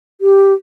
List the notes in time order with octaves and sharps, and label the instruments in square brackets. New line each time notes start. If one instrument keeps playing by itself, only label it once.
[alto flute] G4